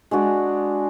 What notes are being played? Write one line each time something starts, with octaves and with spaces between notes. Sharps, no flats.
G#3 D4 F#4 D5